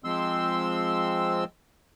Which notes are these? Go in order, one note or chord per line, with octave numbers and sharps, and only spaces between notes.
F3 G#3 C4 C6 E6